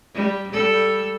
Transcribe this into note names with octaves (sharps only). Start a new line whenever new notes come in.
G3
G3 A4